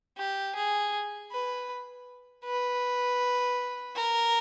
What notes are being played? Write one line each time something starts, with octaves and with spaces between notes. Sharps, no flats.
G4
G#4
B4
B4
A#4